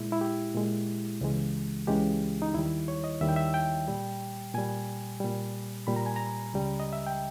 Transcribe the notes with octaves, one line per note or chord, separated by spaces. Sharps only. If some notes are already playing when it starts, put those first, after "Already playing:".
Already playing: A#2 G#3 E4
E4
G4
A#2 G#3
C#2 C#3 E3 G#3
C#2 C#3 E3 G#3 G4
D#4
D#2 D#3 G3 E4
C#5
D#5
D#2 D#3 G3 E5
G5
E5
G5
A#2 G3
A#2 G3 G#5
A#2 G3
A#2 G3 B5
A#5
G#5
A#5
C#2 C#3 G3
D#5
E5
G5